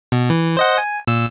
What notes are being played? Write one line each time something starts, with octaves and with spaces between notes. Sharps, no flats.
B2
E3
C5 D#5 F#5
G#5
A#2 E6